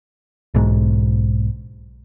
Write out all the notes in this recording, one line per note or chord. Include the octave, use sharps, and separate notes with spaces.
B1 G#2